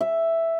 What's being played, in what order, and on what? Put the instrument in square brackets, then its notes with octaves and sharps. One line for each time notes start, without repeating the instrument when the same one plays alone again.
[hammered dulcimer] E5